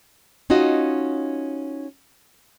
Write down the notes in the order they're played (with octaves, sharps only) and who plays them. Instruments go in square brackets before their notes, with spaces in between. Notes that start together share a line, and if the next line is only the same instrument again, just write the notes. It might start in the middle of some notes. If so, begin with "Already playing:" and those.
[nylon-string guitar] C#4 D#4 F4 F#4 D#5